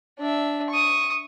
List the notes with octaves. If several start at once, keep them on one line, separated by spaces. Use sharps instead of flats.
D4 E5
C#6 D#6